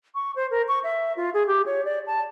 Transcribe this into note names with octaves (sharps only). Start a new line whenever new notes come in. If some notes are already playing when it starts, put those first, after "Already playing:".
C#6
C5
A#4
C#6
E5
F4
G#4
G4
C#5
D5
A5